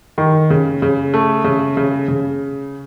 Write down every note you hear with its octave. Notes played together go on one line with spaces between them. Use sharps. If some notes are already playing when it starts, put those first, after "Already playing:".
D#3
C#3
C#3
A3
C#3
C#3
C#3